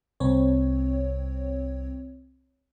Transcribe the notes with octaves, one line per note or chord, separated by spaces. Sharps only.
C2 C4 C#5